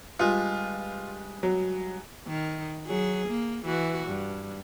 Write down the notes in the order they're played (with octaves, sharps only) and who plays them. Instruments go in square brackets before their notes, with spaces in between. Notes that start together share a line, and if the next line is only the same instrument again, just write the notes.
[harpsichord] G2 G#3 [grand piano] F4
[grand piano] F#3
[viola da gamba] D#3
F#3 G#4
A#3
E3 F#4
G2